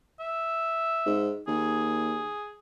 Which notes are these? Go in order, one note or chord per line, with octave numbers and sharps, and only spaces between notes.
E5
G#2
D#2 G#4